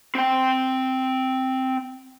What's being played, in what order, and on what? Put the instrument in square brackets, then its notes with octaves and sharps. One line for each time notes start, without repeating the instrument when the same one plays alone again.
[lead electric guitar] C4 G5